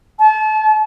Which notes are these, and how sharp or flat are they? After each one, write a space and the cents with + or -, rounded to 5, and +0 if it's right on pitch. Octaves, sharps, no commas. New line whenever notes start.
A5 -35